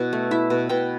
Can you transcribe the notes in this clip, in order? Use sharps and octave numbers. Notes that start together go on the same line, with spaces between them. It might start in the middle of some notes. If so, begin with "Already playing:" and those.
Already playing: B2 E4
A3
E4 E5
B2
B2 G5